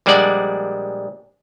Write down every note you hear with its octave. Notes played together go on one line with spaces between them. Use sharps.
A#1 G3 G#3 D4 D5 F#5